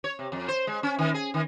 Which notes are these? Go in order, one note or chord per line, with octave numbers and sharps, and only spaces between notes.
C#5
C3
F2
C5
G#3
C#4
D#3
G#4
D#3